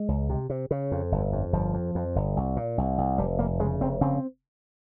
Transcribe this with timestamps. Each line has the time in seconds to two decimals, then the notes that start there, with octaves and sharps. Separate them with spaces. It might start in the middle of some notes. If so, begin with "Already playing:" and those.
Already playing: G#3
0.08 C#2
0.30 C3
0.50 C3
0.71 C#3
0.91 F2
1.12 G1
1.32 F2
1.53 G1 F3
1.74 F2
1.95 F2
2.16 G1
2.37 C2
2.56 A#2
2.78 C2
2.98 C2
3.18 F1 G3
3.39 F1 A#3
3.60 C#3 G#3
3.81 F1 C4
4.01 C#3 C4